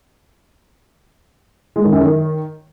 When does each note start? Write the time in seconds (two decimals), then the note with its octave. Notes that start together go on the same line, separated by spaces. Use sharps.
1.76 G#3
1.84 D#3
1.92 F#2
2.00 D#3